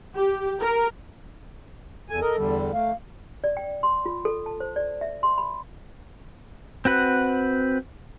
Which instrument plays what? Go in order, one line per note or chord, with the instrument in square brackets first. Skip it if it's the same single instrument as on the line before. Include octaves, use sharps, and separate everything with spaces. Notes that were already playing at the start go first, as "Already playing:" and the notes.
[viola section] G4
A#4
[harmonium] E2 G#5 [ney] A4
[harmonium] A#4 D#5
E2 D3 G3
[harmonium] A3 [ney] F5
[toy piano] D5
G5
C6
F4
A4
A5
C5
D5
E5
C6
B5
[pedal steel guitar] C4 F#4 B4 F#5